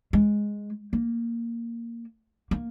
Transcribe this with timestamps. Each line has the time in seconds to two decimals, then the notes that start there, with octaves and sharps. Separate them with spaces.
0.13 G#3
0.93 A#3
2.51 A#3